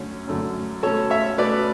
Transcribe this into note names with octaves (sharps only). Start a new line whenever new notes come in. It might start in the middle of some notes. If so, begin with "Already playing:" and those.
Already playing: F#2 D3 A3 C#4
F#2 D3 A3 C#4
B2 A3 C#4 A4 C#5
C#5 E5
B2 A3 C#4 B4 D5